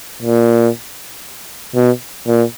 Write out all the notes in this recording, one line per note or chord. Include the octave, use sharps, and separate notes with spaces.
A#2
B2
A#2